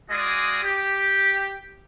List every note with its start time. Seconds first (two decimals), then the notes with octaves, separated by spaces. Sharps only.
0.10 G#3 F4 F#4 D5 G#5 D#6
0.63 G4